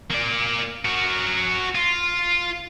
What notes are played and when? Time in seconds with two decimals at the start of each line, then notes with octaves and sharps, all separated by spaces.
0.10 A#3 D5
0.85 F#4 A#4
1.75 F4